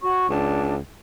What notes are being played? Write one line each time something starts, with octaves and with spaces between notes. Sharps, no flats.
F#4 C#5 C#6
C#2 D4